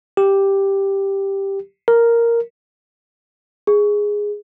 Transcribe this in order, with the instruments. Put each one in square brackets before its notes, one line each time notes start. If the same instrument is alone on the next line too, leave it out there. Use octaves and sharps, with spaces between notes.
[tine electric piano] G4
A#4
[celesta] G#4